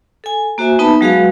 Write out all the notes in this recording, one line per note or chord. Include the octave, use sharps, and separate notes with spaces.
A4 G#5
A#3 F#4 C5 E5 G#5
B3 D#4 B4 E5 A5 B5
F#3 G#3 F#4 G#4 B4 F5